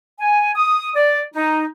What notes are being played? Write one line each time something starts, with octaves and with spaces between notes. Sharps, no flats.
G#5
D#6
D5
D#4